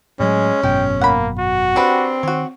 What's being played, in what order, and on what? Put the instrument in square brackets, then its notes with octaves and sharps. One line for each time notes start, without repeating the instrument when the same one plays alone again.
[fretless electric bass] A2 F#3 [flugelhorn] G#3 [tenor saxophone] C#4
[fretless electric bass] G#1 F#2 B2 [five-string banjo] G#3 [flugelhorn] G5
[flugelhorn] A#3 [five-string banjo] F#5 B5
[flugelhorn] F#4
[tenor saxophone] C4 [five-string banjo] D4 G4 B4
[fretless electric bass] D#3 [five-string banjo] F#4 C#5